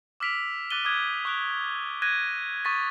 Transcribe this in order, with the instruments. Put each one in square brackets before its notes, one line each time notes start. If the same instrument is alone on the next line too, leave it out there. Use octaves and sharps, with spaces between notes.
[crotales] D6 E6 F6 B6 D7 F7
D6 F#6 A6 D#7 G7
D6 D#6 F#6 G#6
C#6 D#6 F#6 D7 F7
F#6 G#6 A#6 D#7
C#6 D#6 G#6 A6 B6